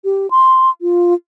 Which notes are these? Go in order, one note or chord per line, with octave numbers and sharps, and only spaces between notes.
G4
C6
F4